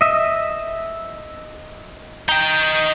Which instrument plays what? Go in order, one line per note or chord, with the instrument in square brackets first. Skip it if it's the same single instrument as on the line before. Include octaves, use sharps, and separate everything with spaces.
[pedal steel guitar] D#5 E5
[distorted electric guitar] D#4 G5 [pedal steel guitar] A#5